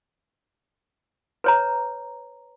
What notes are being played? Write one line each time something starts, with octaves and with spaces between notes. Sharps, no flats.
B4 C#5 A#5